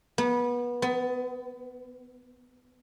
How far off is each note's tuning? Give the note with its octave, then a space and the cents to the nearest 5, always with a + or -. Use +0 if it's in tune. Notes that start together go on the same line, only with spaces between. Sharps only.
B3 -25
B3 +25